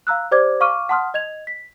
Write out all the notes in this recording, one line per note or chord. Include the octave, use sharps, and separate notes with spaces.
F5 A#5 E6 F#6
G4 C5 D5 D6 G#6
F5 C#6 D6 F6 D#7
F#5 A5 C6 D#6 F6
D#5 G#6 F7
B6